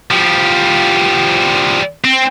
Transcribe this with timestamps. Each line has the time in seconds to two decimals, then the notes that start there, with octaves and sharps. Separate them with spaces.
0.11 F3 G3
2.04 C4